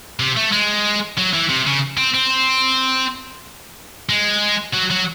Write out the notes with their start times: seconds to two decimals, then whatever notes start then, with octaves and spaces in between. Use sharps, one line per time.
0.20 C3
0.37 A3
0.52 G#3
1.18 F#3
1.33 E3
1.49 C3
1.66 C#3
1.98 C4
2.14 C4
4.09 G#3
4.73 F#3
4.90 F#3